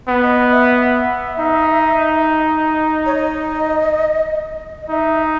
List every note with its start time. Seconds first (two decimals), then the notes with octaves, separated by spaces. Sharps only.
0.08 B3
0.23 D#5
0.52 E5
0.77 E5
1.39 D#4
3.06 C#5
3.15 D#5
4.82 D#5
4.90 D#4 E5